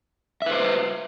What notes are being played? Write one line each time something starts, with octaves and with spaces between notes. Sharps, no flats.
B4 C5 E5